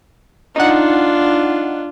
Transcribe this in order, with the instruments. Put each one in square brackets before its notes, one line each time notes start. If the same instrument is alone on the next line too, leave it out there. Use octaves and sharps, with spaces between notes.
[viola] D4 F4 [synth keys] D#4 F#5